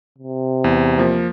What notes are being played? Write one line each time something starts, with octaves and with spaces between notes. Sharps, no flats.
C3
E2
F3 A#3